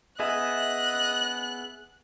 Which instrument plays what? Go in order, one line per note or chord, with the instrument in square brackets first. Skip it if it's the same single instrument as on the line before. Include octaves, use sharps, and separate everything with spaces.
[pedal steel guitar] B3 G#4 E5 [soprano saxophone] D#5 [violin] F#6